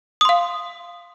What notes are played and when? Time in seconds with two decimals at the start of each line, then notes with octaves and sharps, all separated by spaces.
0.21 D#6
0.25 C6
0.29 F5